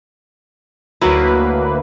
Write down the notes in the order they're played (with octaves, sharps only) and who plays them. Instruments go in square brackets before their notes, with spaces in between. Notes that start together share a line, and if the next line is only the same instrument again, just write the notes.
[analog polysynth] D2 A#3 B4 [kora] F#3 E4